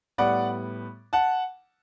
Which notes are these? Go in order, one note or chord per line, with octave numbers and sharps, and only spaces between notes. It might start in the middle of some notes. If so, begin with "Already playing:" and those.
A2 G3 B3 D5 F#5
F#5 A5